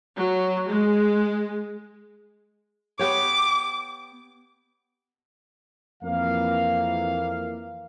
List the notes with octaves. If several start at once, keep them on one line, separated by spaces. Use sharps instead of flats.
F#3
G#3
B3 G4 C#5 D6
F2 E3 A#3 F5